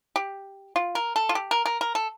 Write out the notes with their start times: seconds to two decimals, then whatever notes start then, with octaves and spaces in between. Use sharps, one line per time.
0.16 G4
0.76 F4
0.95 A#4
1.16 A4
1.29 F4
1.35 G4
1.51 A#4
1.66 A#4
1.81 A#4
1.95 A4